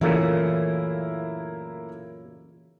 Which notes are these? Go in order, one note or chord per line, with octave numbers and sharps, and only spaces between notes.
F#2 A#2 C#3 E3 A3 A#3 E4